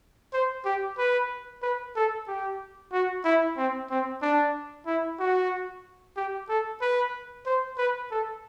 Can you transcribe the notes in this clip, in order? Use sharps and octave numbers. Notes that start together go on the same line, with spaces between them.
C5
G4
B4
B4
A4
G4
F#4
E4
C4
C4
D4
E4
F#4
G4
A4
B4
C5
B4
A4